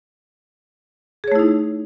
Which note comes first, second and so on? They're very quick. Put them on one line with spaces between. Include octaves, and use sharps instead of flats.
G#4 C#5 A3 E4 D#4